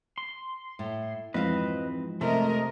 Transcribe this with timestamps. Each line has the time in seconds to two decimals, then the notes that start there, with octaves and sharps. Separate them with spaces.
0.18 C6
0.79 A2
1.34 F2 G#2 E3 C4 B4 D#5 F5
2.21 C3 A3 A#4 D#5